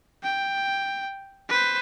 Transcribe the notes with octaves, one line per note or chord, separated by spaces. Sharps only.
G5
B4 C5